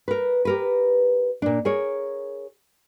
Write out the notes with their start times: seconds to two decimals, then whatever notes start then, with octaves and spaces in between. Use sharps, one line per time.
0.08 A#4 B4
0.45 G4 A#4 B4
1.42 A#2 D4
1.65 G#4 A#4 C#5